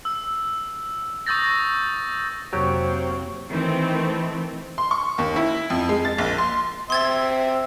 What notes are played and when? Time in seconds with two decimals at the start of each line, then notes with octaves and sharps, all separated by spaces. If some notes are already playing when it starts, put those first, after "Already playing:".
0.05 E6
1.26 C#6 D#6 E6 G6 A6 A#6
2.53 F2 C3 F#3 A#3 C4 G4 C#5
3.49 D#3 E3 A3 C4
4.78 C6
4.91 C#6
5.18 D#2
5.36 E4
5.70 F2
5.89 G#3
6.05 A6
6.18 A#1
6.38 C6
6.90 C4 E5 C6 G#6 A6